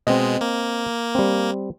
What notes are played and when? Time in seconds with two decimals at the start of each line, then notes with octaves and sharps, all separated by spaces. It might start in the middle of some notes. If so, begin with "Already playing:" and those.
0.07 B2 G#3 C4 D#5
0.41 A#3
1.15 G3 C4